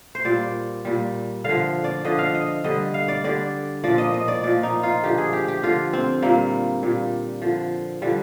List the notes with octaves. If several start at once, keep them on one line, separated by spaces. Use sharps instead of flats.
C5
A#2 G3 D5
A#2 G3
D3 F3 F5
D5
D3 F3 D#5
F5
D#5
D3 G3 D#5
F5
D5
D3 G3 D5
A#2 F3 D5
D#5
D#5
D5
A#2 F3 D5
D#4
F4
D3 F3 G4
G#4
G4
G4
D3 F3 F4
C4
A#2 G3 A#3
A#2 G3
D3 F3
D3 F3 G3